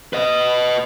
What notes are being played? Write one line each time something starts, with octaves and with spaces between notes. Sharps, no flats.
B4 D#5